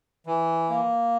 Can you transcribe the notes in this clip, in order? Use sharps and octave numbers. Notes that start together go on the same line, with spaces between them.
E3
A#3